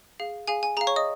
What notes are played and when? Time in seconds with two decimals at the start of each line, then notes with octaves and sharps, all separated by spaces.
0.20 G#4 F5
0.47 G#4 F5 G#5
0.63 G#5
0.77 G#4 F5 A#5
0.87 C#5 C#6
0.96 D#5 D#6